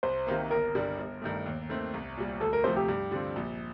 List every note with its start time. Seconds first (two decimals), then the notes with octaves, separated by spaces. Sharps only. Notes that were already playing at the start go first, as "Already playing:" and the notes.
0.03 C2 C5
0.27 C3 D#3 A#3
0.51 G1 A#4
0.75 G2 D3 G3
0.99 G1
1.21 G2 D#3 A3
1.46 D#2
1.69 D#3 A3 C4
1.94 C2
2.17 A#2 G3
2.41 D2 A4
2.53 A#4
2.64 C3 F3 A3 C5
2.76 G4
2.88 G2
3.11 D3 G3 C4 F4
3.36 A#1